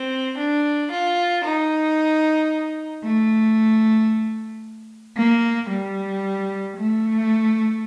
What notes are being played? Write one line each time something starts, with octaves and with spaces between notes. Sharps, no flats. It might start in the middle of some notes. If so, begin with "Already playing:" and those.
Already playing: C4
D4
F4
D#4
A3
A#3
G3
A3